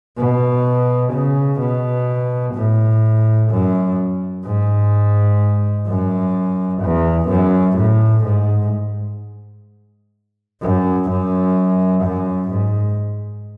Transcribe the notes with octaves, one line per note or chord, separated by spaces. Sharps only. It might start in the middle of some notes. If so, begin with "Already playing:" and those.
B2
C#3
B2
A2
F#2
G#2
F#2
E2
F#2
A2
G#2
F#2
F#2
F#2
G#2